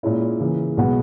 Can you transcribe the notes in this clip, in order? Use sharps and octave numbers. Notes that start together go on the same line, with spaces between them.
A#2 G#3 C#4 E4
C#3 E3 A#3
B1 B2 G#3 B3 F#4